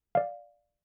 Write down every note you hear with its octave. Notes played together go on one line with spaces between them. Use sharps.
D5 F5